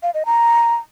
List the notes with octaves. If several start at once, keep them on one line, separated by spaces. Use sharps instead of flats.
F5
D#5
A#5